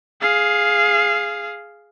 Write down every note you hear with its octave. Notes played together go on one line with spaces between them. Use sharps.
G#4 F5